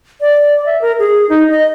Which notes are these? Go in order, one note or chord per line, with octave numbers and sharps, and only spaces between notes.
D5
E5
A#4
G#4
D#4
D#5